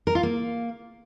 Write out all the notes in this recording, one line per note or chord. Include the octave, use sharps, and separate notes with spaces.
A#4
F4
A#3